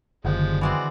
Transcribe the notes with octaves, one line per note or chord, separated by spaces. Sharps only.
F#1 D3 D#3 F3 G3 G#3
E3 G#3 C4 F#4 D5